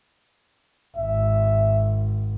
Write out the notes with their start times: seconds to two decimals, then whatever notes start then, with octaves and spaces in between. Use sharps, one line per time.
0.97 G#1 E5